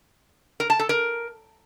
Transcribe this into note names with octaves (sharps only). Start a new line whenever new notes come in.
A#4
A5
A4
A#4